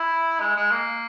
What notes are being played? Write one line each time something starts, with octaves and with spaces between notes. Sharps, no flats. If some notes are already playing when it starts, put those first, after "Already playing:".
Already playing: E4
G#3
G#3
A#3